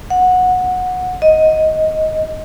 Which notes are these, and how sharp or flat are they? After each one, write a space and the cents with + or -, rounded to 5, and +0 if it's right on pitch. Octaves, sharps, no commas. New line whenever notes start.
F#5 -15
D#5 +10